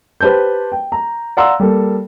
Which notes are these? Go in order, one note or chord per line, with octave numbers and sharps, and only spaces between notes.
G4 B4 C5 A5 G6
G5
A#5
D5 F5 F#5 A#5 C6 E6
G3 A#3 A4